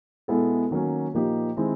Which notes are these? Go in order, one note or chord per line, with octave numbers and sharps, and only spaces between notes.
B2 G#3 B3 E4 A4
D#3 F#3 A#3 C#4
A#2 F3 A#3 D#4 G4
D#3 G#3 C4 E4 G#4